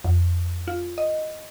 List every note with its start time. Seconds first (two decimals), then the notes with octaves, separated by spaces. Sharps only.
0.04 F2
0.68 F4
0.98 D#5